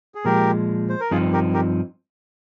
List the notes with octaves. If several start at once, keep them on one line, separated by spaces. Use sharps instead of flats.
G#4
A#2 F3 G#3 G4 A#4
C5
A#4
G2 F3 C4 D#4 F4 G#4
G4 A#4
G4 A#4